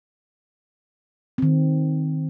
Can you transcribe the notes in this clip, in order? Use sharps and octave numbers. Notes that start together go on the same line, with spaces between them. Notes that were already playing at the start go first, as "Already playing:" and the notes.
D#3 C4